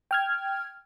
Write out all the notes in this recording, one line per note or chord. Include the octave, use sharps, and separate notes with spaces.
G5 F6 G#6